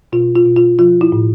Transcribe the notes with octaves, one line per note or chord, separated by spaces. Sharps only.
B2 F4
F4
B2
F4
F3 F4
E4
A2